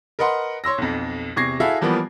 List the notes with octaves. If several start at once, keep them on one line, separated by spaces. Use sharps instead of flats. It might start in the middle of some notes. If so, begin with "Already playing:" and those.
A#4 B4 D#5 F#5 C6
C#5 C6 E6 A#6
B1 F2
E2 C3 C#6 G#6 A#6 C7
E4 F#4 G#4 A4 E5 F5
E3 F3 G3 A#3 B3